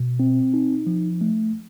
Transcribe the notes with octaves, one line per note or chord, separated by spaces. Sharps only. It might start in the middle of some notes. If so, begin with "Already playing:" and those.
Already playing: B2
C4
D#4
F3
A3